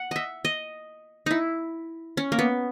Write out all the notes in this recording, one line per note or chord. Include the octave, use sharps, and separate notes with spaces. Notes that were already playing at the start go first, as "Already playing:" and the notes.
Already playing: F#5
D#5 E5
D#5
D#4 E4
C#4
A#3
B3